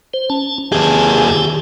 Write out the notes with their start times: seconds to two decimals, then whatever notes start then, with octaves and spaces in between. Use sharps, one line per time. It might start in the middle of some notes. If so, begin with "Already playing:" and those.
0.14 C5
0.30 C#4 A5
0.72 D#2 G4 G#4 G#5 A5